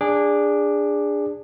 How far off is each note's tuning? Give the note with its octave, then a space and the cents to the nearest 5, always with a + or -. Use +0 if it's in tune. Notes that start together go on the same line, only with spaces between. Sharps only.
D4 +0 G#4 -20 D6 +5